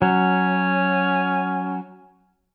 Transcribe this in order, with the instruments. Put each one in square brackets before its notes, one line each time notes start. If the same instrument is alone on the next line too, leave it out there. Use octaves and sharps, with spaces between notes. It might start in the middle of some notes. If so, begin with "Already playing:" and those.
[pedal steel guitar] F#3 [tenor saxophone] C#4